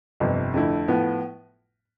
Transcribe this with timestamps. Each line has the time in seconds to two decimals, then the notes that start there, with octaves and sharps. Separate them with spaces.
0.20 G1 F2 C3
0.54 F2 D3 A3 E4
0.88 A2 F3 B3